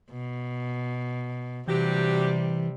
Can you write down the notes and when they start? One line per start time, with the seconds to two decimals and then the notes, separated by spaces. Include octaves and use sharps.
0.11 B2
1.67 C3 E3 F#3 G3 D4 G4